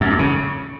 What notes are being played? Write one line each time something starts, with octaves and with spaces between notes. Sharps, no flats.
F#2
G2
C#3